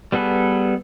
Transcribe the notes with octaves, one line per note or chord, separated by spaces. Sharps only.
G3 B3 G#4 A4 B4